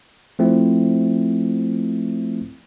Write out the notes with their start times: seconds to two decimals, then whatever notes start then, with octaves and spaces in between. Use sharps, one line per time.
0.39 F3 A3 C4 E4